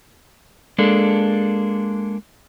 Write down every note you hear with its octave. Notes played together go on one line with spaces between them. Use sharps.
G#3 A#3 D4 A4